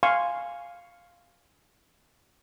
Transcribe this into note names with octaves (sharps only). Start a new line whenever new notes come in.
F5 G#5 C6 C#6